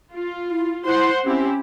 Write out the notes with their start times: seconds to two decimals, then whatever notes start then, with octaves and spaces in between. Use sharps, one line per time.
0.13 F4
0.51 E4
0.85 E4 C5 F#5 C6
1.24 C4 C#4 E4 G4